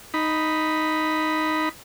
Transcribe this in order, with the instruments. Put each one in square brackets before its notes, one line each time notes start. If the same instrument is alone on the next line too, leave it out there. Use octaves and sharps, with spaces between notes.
[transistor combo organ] D#4 B5